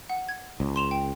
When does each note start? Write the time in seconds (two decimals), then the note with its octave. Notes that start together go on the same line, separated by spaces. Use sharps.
0.10 F#5
0.29 G#6
0.60 C#2
0.76 C6 E7 F7
0.91 G5